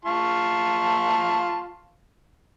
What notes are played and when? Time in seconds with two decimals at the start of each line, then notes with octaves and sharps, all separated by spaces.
0.05 F4 A5 C#6